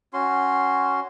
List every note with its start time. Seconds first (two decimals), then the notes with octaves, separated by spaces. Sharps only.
0.13 C#4 F#4 C6